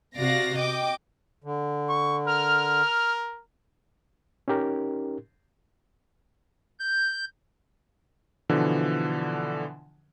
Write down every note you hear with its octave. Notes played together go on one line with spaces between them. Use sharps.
C3 F#4 D5 F5 A#6
D#5 G5 D6
D3
C#6
A#4 F6
C#4 D#4 G4 A#4
G6
B2 D3 E3 F3